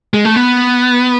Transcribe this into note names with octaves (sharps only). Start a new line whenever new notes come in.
G#3
A3
B3